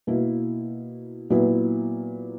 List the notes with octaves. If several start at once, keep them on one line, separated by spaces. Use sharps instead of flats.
B2 A#3 E4
A#2 F#3 B3 E4